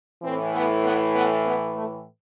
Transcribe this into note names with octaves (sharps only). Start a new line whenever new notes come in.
A2 E3 C4
B3
B3
B3
B3
A3